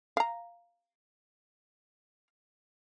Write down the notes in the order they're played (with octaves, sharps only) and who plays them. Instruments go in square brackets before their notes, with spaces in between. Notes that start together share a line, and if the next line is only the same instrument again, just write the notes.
[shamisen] F5 A#5